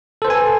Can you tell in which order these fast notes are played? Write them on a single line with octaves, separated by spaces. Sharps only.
A4 C5 B4 G#5